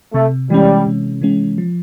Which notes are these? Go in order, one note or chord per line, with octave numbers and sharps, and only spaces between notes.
C3 A3
E3 G3 G#3 C#4
C3
E3 G#3 C#4
F3